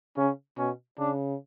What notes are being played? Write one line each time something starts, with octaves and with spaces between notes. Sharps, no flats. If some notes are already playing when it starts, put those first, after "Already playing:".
C#3 C#4
B2 C#4
C#3 D4